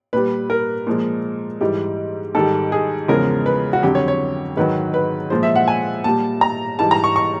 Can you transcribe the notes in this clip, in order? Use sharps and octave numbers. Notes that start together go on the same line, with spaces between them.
A#2 G3 B4
A#4
A#2 F3 G#3
G#2 E3 G3
G#2 D#3 G3 A4
G#4
E2 C#3 F3 G#3 A#4
B4
F#4
F2 D3 F#3 G4
C#5
C#5
G#2 D#3 F#3 B4
B4
A#2 F3 G#3 C5
E5
F#5
G#5
A#2 G3 A5
A#5
G#2 E3 G3 A5
A#5
C#6
C#6